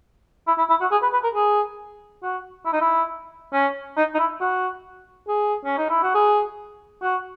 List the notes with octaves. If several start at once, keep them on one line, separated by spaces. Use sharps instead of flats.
E4
E4
E4
F#4
G#4
B4
B4
A#4
G#4
F#4
E4
D#4
E4
C#4
D#4
D#4
E4
F#4
G#4
C#4
D#4
E4
F#4
G#4
F#4